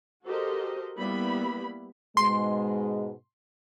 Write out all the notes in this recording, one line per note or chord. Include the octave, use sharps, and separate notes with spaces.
F#4 G4 A4 A#4 C5 D#5
G3 A#3 B3 E4 B5
G#2 B2 G#3 C6